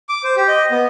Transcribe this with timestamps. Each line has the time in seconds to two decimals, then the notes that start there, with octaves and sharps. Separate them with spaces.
0.09 D6
0.24 C5
0.36 G4
0.48 D#5
0.71 B3